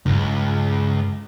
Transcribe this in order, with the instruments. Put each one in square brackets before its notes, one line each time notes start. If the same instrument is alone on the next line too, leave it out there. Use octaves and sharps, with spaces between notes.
[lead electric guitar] C#2 [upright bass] G2 D#4